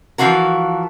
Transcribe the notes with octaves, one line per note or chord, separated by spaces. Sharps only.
E3 F3 F4 F#4 A#4